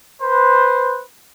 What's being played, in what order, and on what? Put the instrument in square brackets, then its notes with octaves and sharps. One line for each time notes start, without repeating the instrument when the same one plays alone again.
[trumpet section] B4 C5